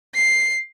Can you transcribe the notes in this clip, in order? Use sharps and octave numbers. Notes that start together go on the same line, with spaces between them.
C7